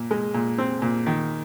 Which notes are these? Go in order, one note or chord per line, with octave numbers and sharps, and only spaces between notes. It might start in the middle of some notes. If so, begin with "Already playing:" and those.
Already playing: A#2
G#3
A#2
C4
A#2
D#3